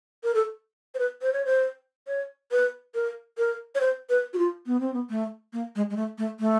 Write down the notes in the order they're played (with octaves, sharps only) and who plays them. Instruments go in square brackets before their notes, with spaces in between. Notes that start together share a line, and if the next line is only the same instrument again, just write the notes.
[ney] A#4
A4
C5
B4
C5
C#5
C5
C#5
B4
A#4
A#4
C#5
C5
B4
F#4
F4
B3
C4
B3
A3
A#3
G#3
G#3
A3
A3
A3